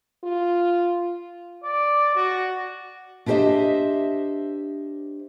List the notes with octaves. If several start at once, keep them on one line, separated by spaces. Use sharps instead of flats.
F4
D5
F#4
D4 E4 G4 C5 D#5 E5